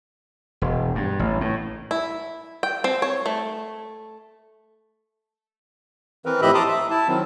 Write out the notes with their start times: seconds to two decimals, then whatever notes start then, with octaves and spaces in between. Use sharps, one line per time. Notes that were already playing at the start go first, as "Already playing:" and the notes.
0.62 E1
0.95 G2
1.19 A1
1.41 A2
1.91 E4
2.63 G5
2.84 C4
3.02 C#5
3.26 A3
6.26 E3 C4 A#4 B4
6.42 A2 F3 G4 D#5 E5 B5
6.54 A5 A#5 C6 D6 D#6
6.68 E5
6.91 E4 A5
7.08 D#3 F#3 C4